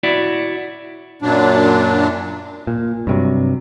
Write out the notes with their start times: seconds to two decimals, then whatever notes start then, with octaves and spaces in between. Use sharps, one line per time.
0.03 E4 F#4 D5
1.22 F#2 A#2 F#3 D4
2.67 A#2
3.07 G2 C3 F#3